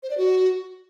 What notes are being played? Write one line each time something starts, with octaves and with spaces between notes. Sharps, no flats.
C5
D5
F#4